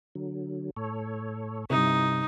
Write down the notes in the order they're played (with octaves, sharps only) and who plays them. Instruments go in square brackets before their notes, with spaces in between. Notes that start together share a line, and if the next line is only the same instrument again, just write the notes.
[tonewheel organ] D3 F#3
A2 A4 C#5
[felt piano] G2 C3 [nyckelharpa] D#4 [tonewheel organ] E4